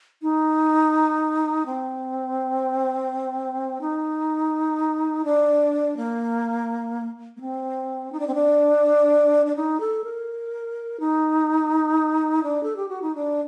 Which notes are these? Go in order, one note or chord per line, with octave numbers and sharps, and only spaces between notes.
D#4
C4
D#4
D4
A#3
A#3
C4
D#4
D4
C4
D4
D4
D#4
A4
A#4
D#4
D4
A4
G4
F#4
D#4
D4